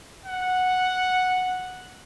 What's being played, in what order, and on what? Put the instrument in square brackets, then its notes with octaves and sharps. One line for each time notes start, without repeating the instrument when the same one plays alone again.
[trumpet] F#5